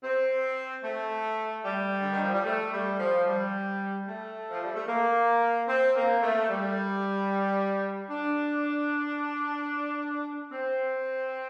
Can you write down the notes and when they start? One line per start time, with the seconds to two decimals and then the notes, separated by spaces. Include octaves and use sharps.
0.03 C4
0.83 A3
1.65 G3
2.01 D3
2.12 D#3
2.23 F3
2.34 G3
2.45 A3
2.72 G3
2.99 F3
3.26 G3
4.06 A3
4.50 F3
4.62 G3
4.74 A3
4.87 A#3
5.68 C4
5.95 A#3
6.22 A3
6.49 G3
8.10 D4
10.52 C4